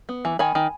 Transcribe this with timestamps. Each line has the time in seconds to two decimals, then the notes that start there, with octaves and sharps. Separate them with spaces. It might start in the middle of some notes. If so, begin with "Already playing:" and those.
0.09 B3
0.25 E3
0.39 D#3 G#5 B5
0.55 D#3